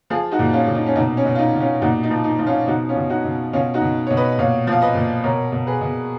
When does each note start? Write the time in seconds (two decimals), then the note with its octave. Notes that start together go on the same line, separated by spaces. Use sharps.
0.10 F3 F4 G#4
0.31 D#4 F#4
0.39 A#2
0.53 C#4 F4
0.68 A#2
0.75 D#4
0.86 C#4
0.96 B2 D#4
1.17 C#4
1.25 B2
1.35 F4
1.38 D#4
1.53 B2
1.60 C#4 F4
1.81 A#2 D#4 F#4
2.03 D#4
2.10 F3
2.24 D#4
2.38 F3 D#4
2.46 C#4 F4
2.67 B2 D#4 F#4
2.89 C#4 F4
2.96 B2
3.10 D#4 F#4
3.24 B2
3.53 B2 C#4 F4
3.74 D#4 F#4
3.81 B2
4.07 B2 C#5
4.17 B4 D#5
4.38 A#2 C#5 F5
4.67 F3 F5
4.82 B4 D#5
4.95 A#2
5.24 B2 A#4 C#5
5.52 B2
5.67 G#4 B4
5.81 B2